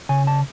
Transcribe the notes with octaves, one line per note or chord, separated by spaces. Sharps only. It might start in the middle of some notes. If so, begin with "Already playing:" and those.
C#3 G#5
A5